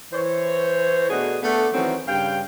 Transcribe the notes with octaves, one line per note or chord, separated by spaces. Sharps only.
E3 C5 C#5
B2 A3 D4 G#4 D#5 F#5
A3 B3 D4
D#3 E3 F#3 C4 C#4 F#4
G2 C#3 F5 G5